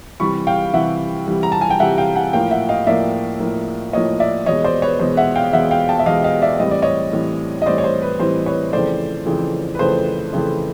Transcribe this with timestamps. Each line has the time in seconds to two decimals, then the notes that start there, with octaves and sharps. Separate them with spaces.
0.20 C3 E3 G3 B5 C#6
0.47 F5 G5
0.74 C3 E3 G3 E5 F#5
1.27 C3 E3 G3
1.43 A#5
1.52 A5
1.61 G#5
1.70 G5
1.80 C3 E3 G3 E5 F#5
1.98 F5 G5
2.15 F#5 G#5
2.33 A2 F3 A#3 F5 G5
2.51 E5 F#5
2.69 D#5 F5
2.86 A2 F3 A#3 D5 E5
3.40 A2 F3 A#3
3.93 A2 F3 A#3 C#5 D#5
4.20 D5 E5
4.46 E2 B2 G#3 C#5 D#5
4.64 C5 D5
4.82 B4 C#5
5.00 E2 B2 G#3 C5
5.17 E5 F#5
5.35 F5 G5
5.53 E2 B2 G#3 E5 F#5
5.71 F5 G5
5.89 G5 A5
5.99 E5
6.06 E2 B2 G#3 D#5 F5
6.24 D#5 F5
6.42 D5 E5
6.60 A2 E3 G3 C4 D#5
6.71 D5
6.82 C#5 D#5
7.13 A2 E3 G3 C4
7.62 D#5
7.66 A2 E3 G3 C4 C5 D5
7.78 C#5
7.84 C5
8.02 B4
8.20 A2 E3 G3 C4 C5
8.46 B4 C#5
8.73 F2 C#3 E3 A3 C5 D5
9.26 F2 C#3 E3 A3
9.75 B4
9.79 F2 C#3 E3 A3 C5
10.33 F2 C#3 E3 A3